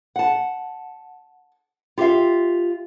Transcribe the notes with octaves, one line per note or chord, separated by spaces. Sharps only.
F#5 A5
F4 G4 A4 E5 F5